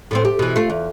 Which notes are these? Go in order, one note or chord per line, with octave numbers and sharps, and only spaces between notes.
A2 B3 C4
G4
B2 E3
A3 F4
E2